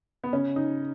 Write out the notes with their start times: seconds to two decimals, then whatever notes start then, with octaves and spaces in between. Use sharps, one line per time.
0.24 B3
0.33 C#3 C#4
0.56 C#3 D#4